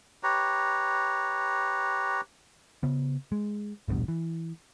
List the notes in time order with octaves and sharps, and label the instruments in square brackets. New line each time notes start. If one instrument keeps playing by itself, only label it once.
[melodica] G4 B4 C#5 A#5
[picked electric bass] C#3 B3
G#3
D#1 A1 G2 B2
E3